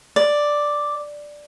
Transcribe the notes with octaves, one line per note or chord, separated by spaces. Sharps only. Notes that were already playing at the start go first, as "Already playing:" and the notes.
D5